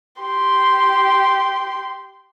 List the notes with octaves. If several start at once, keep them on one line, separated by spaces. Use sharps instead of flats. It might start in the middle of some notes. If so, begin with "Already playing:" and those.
G4 C6